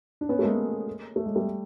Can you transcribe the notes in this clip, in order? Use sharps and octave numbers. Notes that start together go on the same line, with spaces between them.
D4
B3 C#4
A3
G#3 A#3
A3
G#3
G3 A3